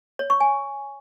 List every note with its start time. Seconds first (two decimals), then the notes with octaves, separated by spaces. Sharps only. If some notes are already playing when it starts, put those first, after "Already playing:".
0.19 C#5
0.30 C#6
0.40 G#5